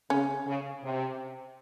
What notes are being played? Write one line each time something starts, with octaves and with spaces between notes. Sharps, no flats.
C#3 C#4
C#3
C3